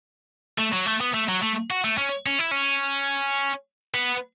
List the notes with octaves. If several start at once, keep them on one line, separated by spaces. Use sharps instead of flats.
A3
F#3
A3
B3
A3
F#3
A3
F#4
A3
C#4
C#4
E4
C#4
B3